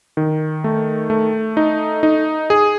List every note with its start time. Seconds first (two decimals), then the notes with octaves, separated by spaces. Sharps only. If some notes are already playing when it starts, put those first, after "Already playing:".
0.17 D#3
0.64 A3
1.10 A3
1.57 D#4
2.03 D#4
2.50 G#4